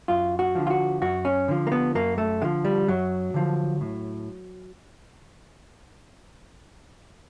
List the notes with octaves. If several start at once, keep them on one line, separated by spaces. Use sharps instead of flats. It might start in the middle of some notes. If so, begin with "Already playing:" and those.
F#2 F4
F#4
D3 F3
F4
F#4
F#2 F#4
C#4
D3 F3
A#3
B3
F#2 A#3
A3
D3 F3 G#3
G3
F#2 F#3
D3 F3
A2